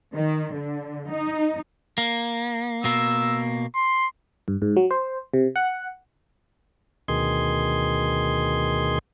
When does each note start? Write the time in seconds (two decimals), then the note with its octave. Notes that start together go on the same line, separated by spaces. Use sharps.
0.13 D#3
0.54 D3
1.09 D#4
1.98 A#3
2.84 B2 A#3 E6
3.75 C6
4.48 G2
4.62 G#2
4.77 F#3
4.91 C5
5.34 C3
5.56 F#5
7.08 D2 B2 D#3 G#4 C6